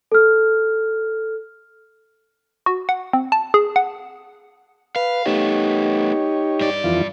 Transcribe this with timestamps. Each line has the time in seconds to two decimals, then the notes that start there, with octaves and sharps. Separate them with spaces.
0.12 A4 F6
2.66 F#4
2.89 F#5
3.13 C4
3.32 A5
3.54 G#4
3.76 F#5
4.96 B4 F5
5.26 A3 B3 D#4 G4 C#5
6.61 G2 D5
6.84 F2 E3 F4